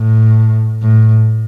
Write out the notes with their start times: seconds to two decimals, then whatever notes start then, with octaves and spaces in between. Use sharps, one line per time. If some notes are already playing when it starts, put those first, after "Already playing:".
Already playing: A2
0.82 A2